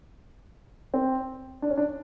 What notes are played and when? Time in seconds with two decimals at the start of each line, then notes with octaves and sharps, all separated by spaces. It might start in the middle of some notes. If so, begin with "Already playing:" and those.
0.94 C4
1.62 D4
1.70 C#4
1.77 D4